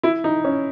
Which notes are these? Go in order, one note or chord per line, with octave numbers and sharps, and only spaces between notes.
E4
D#4
C#4